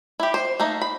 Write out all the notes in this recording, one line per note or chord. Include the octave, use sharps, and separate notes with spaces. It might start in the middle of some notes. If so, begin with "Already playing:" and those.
E4 G4
C5
A3 A#3 D#4
B5